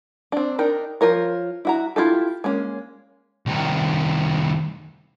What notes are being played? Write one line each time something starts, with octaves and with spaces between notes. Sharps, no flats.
C4 D4
D4 D#4 A#4 G5
F3 F4 A#4 C#5
E4 F#4 A#5
E4 F4 G4 A4
G#3 A#3 C#4
C2 D#3